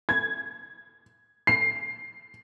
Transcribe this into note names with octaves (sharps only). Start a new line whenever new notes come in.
G#6
C7